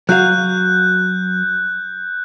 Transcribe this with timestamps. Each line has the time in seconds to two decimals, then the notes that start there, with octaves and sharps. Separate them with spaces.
0.09 F#3 F#4 F5 F#6 G6